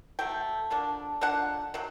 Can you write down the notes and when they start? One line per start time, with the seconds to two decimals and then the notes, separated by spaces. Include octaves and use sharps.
0.19 F#3 A3 G5
0.70 D3 F3 A#3 D4
1.21 D3 F3 A#3 D4 F#5
1.74 C3 D#3 F#3